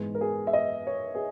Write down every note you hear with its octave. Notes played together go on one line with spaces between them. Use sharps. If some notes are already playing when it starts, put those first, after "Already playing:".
Already playing: G#2 E3 G#3 B3
A#4
G#4
E5
D#5
C#5
G#4